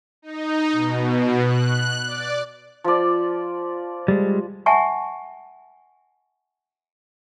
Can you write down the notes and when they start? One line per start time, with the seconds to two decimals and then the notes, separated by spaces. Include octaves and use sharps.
0.22 D#4
0.72 B2
1.44 F#6
2.05 D5
2.84 F3 D5
4.08 G3 G#3
4.66 E5 F#5 G#5 A5 C#6